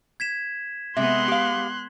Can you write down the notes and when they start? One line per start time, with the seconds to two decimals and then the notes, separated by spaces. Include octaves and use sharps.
0.20 G#6 B6 E7
0.97 C3 G#3 B3 E5 C6 F#6
1.28 G4 F5